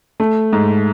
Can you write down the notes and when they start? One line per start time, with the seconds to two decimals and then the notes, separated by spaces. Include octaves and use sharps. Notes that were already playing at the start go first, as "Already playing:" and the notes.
0.20 A3
0.53 G#2